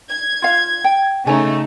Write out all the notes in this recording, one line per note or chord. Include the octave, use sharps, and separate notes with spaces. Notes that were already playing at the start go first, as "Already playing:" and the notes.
G#6
F4 F5
G5
C#3 A3 D#4 C#5 G#5